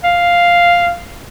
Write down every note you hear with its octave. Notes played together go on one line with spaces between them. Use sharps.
F5